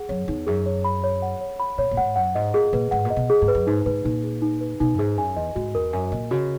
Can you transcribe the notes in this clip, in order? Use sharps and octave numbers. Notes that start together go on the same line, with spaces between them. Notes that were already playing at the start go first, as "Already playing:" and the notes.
Already playing: G#4 F#5
F#2 C#5
E2 D#4
F#2 G#4
C#5
B5
C#5
F#5
C#5
B5
A#2 C#5
A#2
G#2 F#5
F#2 F#5
G#2 D#5
A#2 G#4
A#2 B4
G#2 F#5
A#2
D#5
B2
G#4
G#2
B4
F#2
G#2 D#4
G#2 B4
A#2 D#4
G#4
D#4
B4
B2 D#4
F#2
G#2 G#4
F#2 G#5
E2 D#5
G#2 F#4
E2 A#4
F#2 G#5
A#2 D#5
C#3 F#4